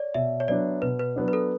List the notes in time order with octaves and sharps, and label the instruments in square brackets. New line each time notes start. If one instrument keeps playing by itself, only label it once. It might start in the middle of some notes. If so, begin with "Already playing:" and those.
Already playing: [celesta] C#5 D5
[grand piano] B2 [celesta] E5
[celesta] C#5
[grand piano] F#3 B3 D4 [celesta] D5
[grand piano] B2 [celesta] B4
[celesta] B4
[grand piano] F#3 B3 D4
[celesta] B4
A4